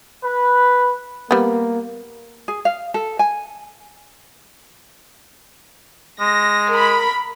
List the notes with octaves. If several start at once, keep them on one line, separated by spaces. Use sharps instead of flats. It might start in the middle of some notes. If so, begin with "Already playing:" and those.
B4
G3 A#3 B3
G#4
F5
A4
G#5
G#3 A#6
A#4 B5